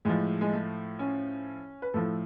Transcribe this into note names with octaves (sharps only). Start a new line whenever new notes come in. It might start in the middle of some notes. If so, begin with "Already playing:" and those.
A2 F3 G#3
G#3
A3
C#4
B4
A2 F3 A4